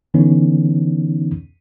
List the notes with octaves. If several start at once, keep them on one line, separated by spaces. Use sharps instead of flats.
D3 E3 B3 C#4 D#4